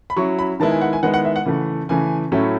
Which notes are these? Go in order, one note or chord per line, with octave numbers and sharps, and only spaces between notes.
B5
F#3 C#4 E4 C#6
B5
D#3 G#3 B3 E4 A5
G#5
F#5
G#5
D#3 G#3 B3 E4 F#5
F#5
E5
F#5
C#3 E3 A3
C#3 E3 A3 G#5
A2 F#3 A3 C#4 E4